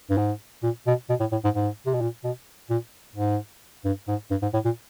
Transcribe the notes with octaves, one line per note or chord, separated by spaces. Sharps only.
G2
G#2
A#2
B2
B2
A2
A2
G#2
G#2
C3
B2
A#2
B2
A#2
G#2
G2
G#2
G2
G#2
A2
A#2